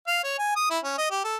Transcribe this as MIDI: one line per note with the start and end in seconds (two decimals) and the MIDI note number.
0.07 0.22 77
0.24 0.34 73
0.39 0.53 80
0.56 0.68 87
0.70 0.79 64
0.84 0.96 61
0.98 1.10 75
1.11 1.19 67
1.24 1.36 69